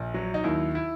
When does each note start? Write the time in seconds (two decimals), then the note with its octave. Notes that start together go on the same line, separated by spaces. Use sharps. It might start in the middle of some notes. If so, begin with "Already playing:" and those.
Already playing: A#1
0.14 F#3
0.34 D#4
0.44 D#2 E4
0.75 E4